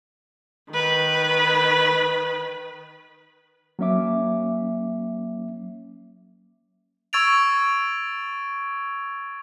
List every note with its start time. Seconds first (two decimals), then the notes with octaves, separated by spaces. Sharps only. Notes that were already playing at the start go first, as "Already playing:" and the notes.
0.71 D#3 B4
3.79 F#3 A#3 C#4 E5 D6
7.13 C#6 E6 G#6 A6 D7 F7